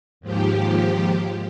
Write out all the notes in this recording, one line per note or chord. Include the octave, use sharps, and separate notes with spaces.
D#2 G#2 F3 G4